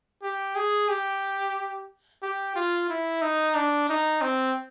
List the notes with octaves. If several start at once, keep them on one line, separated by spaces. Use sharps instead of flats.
G4
G#4
G4
G4
F4
E4
D#4
D4
D#4
C4